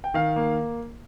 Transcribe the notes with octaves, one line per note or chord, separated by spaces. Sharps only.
G5
D#3 F5
A#3